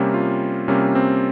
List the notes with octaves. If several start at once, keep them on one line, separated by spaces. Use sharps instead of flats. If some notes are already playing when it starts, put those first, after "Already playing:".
Already playing: C3 G3 A#3 C#4
F4
C3 G3 A#3 C#4
C4